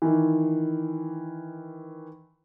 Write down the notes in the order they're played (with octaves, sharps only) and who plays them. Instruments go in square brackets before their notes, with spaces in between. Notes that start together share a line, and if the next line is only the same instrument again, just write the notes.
[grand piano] D#3 E3